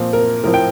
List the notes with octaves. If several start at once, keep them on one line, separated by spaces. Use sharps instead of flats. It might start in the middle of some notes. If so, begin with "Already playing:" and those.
Already playing: A#2 F3 C4
A#4
A2 F3 C4 A#4
G5